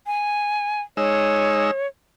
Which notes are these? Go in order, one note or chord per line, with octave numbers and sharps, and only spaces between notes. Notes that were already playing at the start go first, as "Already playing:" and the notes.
G#5
G#3 D#4 C#5 E6